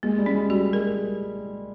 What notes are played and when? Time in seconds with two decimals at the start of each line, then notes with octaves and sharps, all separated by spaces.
0.03 G#3 A#3
0.18 G3
0.26 C#4
0.35 G#3
0.49 G3 F#4
0.73 G#3 A#4